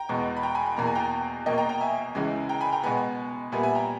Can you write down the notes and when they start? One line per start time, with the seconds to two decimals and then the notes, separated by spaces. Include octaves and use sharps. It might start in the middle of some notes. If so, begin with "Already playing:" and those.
Already playing: G5 A#5
0.09 E2 B2 G#3 B3
0.37 B5
0.43 G5 A#5
0.55 G#5 B5
0.66 B5
0.76 E2 B2 A#3 A#5
0.86 G#5
0.95 G5 A#5
1.46 B2 A#3 D#5 G5
1.58 G5 A#5
1.69 G5 A#5
1.81 E5 G#5
2.15 C#2 C#3 E3 G#3
2.49 G5 A#5
2.61 G#5 B5
2.72 G5 A#5
2.83 B2 G#3 B3 G#5 B5
3.52 A#2 G3 B3 E5 G#5
3.63 E5 G#5
3.75 G5 A#5